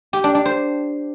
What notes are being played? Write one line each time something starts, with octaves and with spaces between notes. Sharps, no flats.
G4
D4
D4
C5